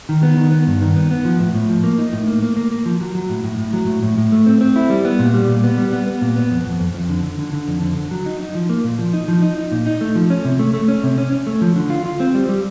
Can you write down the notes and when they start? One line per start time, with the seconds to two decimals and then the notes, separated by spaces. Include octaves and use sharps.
0.09 D#3
0.23 B3
0.37 D#3
0.52 B3
0.67 G2
0.82 D#3
0.96 B3
1.11 B3
1.25 F3
1.40 A2
1.55 A2
1.69 F3
1.84 A#3
1.98 D#4
2.13 A2
2.27 A#3
2.42 A#3
2.57 A#3
2.71 A#3
2.86 F3
3.01 F#3
3.15 F#3
3.30 A2
3.44 A2
3.58 A2
3.73 F#3
3.87 A2
4.03 A2
4.18 A2
4.32 A3
4.46 C4
4.61 C4
4.76 E4
4.90 G3
5.05 B3
5.19 A#2
5.34 G3
5.48 A#2
5.64 B3
5.78 G3
5.93 B3
6.07 B3
6.22 A#2
6.36 B3
6.51 F2
6.65 F2
6.80 F2
6.94 F2
7.09 D3
7.23 D3
7.39 D3
7.53 D3
7.68 F2
7.82 D3
7.97 D3
8.11 F#3
8.26 D#4
8.41 D#4
8.55 F3
8.70 A#3
8.84 A#2
8.99 F3
9.13 D#4
9.28 F3
9.42 D#4
9.58 D#4
9.72 A#2
9.87 D#4
10.01 A3
10.16 F3
10.30 C#4
10.45 C3
10.59 A3
10.74 A3
10.88 C#4
11.03 C3
11.18 C#4
11.32 C#4
11.47 A3
11.61 F3
11.76 D3
11.90 F4
12.06 F4
12.20 C4
12.34 G3
12.49 G3